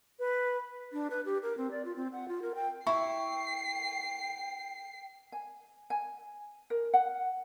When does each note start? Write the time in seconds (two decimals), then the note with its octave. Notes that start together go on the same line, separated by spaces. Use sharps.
0.19 B4
0.93 D4
1.10 B4
1.25 G4
1.43 A#4
1.58 C4
1.71 D5
1.85 F4
1.96 C4
2.13 F#5
2.28 F4
2.42 A#4
2.55 G5
2.87 E4 G5 C#6 C7
5.32 G#5
5.90 G#5
6.70 A#4
6.94 F#5